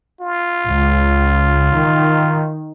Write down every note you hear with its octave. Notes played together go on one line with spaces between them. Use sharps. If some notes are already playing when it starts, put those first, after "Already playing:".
F4
C#2
D#3